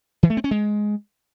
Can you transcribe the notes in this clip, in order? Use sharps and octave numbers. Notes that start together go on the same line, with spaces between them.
E3
A3
C4
C#4
G#3